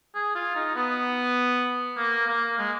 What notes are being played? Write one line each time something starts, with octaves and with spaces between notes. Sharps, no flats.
G#4
F4
D#4
B3
A#3
A#3
G#3